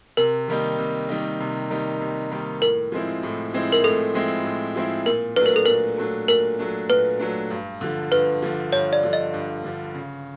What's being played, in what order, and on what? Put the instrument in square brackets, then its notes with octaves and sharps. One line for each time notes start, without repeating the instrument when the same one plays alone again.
[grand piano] C3 [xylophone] A#4
[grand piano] D#3 G3 A#3 D#4
C3
D#3 G3 A#3 D#4
C3
D#3 G3 A#3 D#4
C3
D#3 G3 A#3 D#4
[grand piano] A2 [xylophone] A#4
[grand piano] F3 G#3 C4 E4
A2
F3 G#3 C4 E4
[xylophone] A#4
[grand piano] A2 [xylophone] A4
[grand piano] F3 G#3 C4 E4
A2
F3 G#3 C4 E4
[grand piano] A#2 [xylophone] A#4
[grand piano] F#3 A3 D4 [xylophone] B4
[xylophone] A#4
A4
[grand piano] A#2 [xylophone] A#4
[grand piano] F#3 A3 D4
[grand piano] A#2 [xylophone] A#4
[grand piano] F#3 A3 D4
[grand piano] A#2 [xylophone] B4
[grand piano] F#3 A3 D4
G2
D3 F3
[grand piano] G2 [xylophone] B4
[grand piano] D3 F3
[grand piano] G2 [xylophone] C#5
[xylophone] D5
[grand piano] D3 F3
[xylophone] D#5
[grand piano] G2
D3 F3
C#3